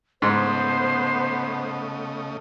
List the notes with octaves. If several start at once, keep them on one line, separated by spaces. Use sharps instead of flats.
G#2 C#3 A3 B3 C5 D#5